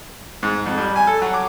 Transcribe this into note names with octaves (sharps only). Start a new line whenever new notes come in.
G#2
F2
G3
G#5
A4
F#3
D6